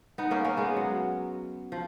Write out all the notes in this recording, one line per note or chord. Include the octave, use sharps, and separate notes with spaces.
B3 D#4
A#3 C#4
A#3 C#4
G#3 B3
F#3
F3